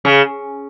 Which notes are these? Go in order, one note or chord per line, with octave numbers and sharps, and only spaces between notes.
C#3